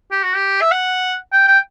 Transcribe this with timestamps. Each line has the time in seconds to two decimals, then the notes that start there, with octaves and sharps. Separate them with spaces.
0.11 G4
0.23 F#4
0.35 G4
0.61 E5
0.71 F#5
1.32 G5
1.48 G5